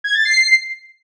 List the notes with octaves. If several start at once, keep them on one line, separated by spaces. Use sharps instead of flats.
G#6
A6
C7